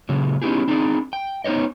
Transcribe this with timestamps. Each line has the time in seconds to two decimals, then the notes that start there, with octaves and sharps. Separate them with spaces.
0.09 A#2 C#3 F#3
0.42 B3 C#4 D#4 E4 G4 G#4
0.68 C4 D4 D#4 G#4 A4 D5
1.13 G5
1.44 B3 D#4 C5 C#5 D#5